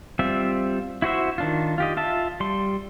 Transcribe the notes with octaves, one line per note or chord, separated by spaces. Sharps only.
G3 C4 F4 E5
E4 F#4 C5 E5
D#3 D4 F4
F4 G4 D#5
F4 E5 A5
G3 C6